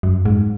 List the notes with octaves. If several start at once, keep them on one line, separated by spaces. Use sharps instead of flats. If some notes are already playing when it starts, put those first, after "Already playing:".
F#2
G#2